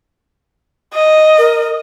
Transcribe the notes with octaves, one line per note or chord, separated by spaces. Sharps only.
D#5
A#4